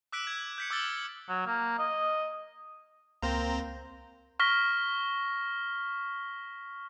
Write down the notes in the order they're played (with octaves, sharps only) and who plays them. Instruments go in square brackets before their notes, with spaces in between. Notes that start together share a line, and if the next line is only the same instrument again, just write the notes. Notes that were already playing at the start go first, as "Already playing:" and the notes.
[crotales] D6 E6 F#6 B6 D7
G#6
G6 B6 C#7
D6 E6 F6 A6 G7
[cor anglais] F#3
A#3
D#5
[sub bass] C#2 [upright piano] A#3 [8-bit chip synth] C4 C5 A#5
[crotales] C#6 F6 A#6 B6 G7